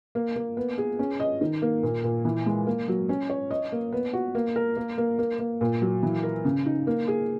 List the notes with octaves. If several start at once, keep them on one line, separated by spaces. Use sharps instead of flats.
A#3
A#3
B3
G#4
C#4
D#5
D#3
A#3
A#2
A#2
E3
G#3
A#3
F#3
C#4
C#5
D#5
A#3
B3
F#4
A#3
A#4
A#3
A#3
A#3
A#3
A#2
F#3
E3
A#4
C#3
D#4
A#3
G#4